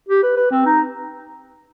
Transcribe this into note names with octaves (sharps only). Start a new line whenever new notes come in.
G4
B4
B4
C4
D#4